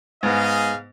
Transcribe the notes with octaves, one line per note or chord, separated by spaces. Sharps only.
G#2 B3 G#4 D#5 F5